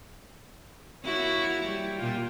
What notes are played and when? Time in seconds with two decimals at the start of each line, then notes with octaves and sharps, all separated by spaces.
1.05 A#3 E4 F#4 C#5
1.63 G3 G5
1.97 A#2 F4